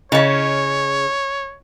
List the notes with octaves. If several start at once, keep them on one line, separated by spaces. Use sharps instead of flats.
C#3 C#4 E4 C#5 D#5